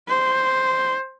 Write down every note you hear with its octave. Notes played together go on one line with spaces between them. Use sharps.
C5